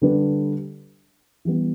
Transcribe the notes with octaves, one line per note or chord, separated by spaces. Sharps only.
D3 G3 D4 B4
E3 G3 B3